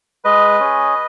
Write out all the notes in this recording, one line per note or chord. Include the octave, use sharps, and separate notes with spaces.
G#3 B4 D#5
C#4 G#4